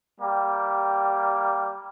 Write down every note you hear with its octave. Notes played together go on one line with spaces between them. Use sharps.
G3 A#3 G4